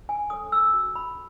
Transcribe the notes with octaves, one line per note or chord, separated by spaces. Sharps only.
G#5
A4 C#5 D#6
E6
F#4
B5